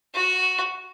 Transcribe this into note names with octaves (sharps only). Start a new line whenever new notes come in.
F#4